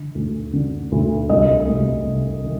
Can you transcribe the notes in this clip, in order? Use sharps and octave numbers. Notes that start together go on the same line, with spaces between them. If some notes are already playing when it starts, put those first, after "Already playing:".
Already playing: D3
D2
D3
D2
C2 D#5
C2
C3
D#3